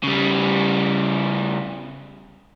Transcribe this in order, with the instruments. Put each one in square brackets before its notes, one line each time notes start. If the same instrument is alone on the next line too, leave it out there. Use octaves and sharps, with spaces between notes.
[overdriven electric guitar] C#3 G3